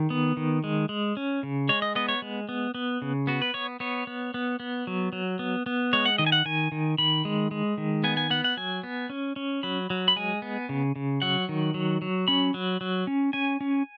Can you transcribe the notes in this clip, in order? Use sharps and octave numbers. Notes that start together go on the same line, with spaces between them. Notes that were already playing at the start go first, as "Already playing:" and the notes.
Already playing: D#3 G#4
B3
D#3
G#3
G#3
C#4
C#3
G#3 C#5
D#5
B3 D#5
C#5
G#3
B3
B3
C#3
B3 F#4
B4
B3 C#5
B3 C#5
B3
B3
B3
F#3
F#3
B3
B3
G#3 C#5
F#5
D#3 D#5
G#5
F#5
D#3 G#5
D#3
D#3 B5
G#3
G#3
D#3
B3 G#5
G#5
B3 F#5
F#5
F#3 G#5
B3
C#4
C#4
F#3 B5
F#3
B5
G#3 G#5
B3
C#3
C#3
F#3 F#5
D#3
F#3
F#3
C#4 B5
F#3
F#3
C#4
C#4 G#5
C#4